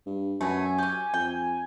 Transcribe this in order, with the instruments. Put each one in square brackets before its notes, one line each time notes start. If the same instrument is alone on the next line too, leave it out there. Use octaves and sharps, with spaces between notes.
[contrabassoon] G2
[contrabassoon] F#2 [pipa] B2 A3 [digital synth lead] G#5
[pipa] C#4 G4
[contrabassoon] F2 [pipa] G5